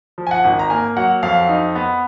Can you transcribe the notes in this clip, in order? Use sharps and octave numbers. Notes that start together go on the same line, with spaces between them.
F3
G#5
F#5
G#1
A#5
A#3 G#5
F#3 F#5
F2 F5
D#4
B3